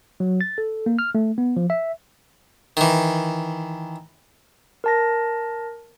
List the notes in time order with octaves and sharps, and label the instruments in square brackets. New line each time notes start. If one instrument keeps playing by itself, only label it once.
[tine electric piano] F#3
A6
A4
A#3
F6
A3
B3
F3
E5
[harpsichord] D#3 E3
[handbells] A#4 A5 A#6